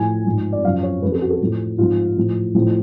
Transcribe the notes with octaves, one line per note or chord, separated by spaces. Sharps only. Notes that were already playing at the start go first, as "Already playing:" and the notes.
Already playing: A2 F3 G#5
G#2 F3
D5
F#2 C#3 F3 F5
C#5
F2 C#3 F3 B4
A4
F#4
A4
A2 F3
G#2 F3 F4
A2 F3
A2 F3